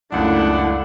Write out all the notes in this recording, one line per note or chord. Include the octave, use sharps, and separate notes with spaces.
C#2 F#2 A3 D4 E4 F#5